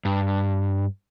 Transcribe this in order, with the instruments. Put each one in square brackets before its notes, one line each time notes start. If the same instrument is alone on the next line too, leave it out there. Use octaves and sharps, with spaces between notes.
[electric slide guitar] G2